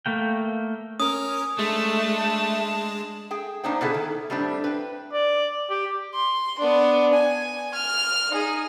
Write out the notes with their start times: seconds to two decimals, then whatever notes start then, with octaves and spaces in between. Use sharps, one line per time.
0.06 A3 A#3 G5
1.00 C#4 A#4 D#6
1.59 G#3 A3 D4 A5
3.31 G#4 G5
3.64 A#3 B3 D4 D#4 C5 G5
3.81 B2 D3 B3 E4 G#4 A4
3.94 D#3
4.30 A2 G3 C4 D4
4.64 B4 G5
5.13 D5
5.70 G4
6.15 C6
6.59 B3 D4
7.13 G#5
7.74 F6
8.30 D#4 G#4